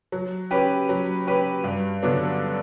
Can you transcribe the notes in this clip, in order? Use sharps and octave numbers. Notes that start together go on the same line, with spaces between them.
F#3
C#4 G4 B4
F#3
C#4 G4 B4
G2
D3 F#3 B3 D4